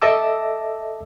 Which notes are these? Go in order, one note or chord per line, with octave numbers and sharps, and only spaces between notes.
A4 D#5 E5 A5 D6 E6